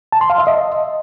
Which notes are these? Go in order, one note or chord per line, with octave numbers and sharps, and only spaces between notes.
A5
C6
F5
E5
D#5